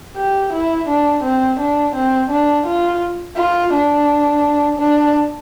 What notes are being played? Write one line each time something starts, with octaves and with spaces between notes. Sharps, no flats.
G4
E4
D4
C4
D4
C4
D4
F4
F4
D4
D4